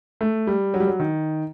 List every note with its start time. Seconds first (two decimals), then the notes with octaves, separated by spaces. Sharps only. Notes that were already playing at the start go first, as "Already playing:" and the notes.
0.21 A3
0.47 G3
0.74 F#3
0.80 G3
0.88 F#3
1.00 D#3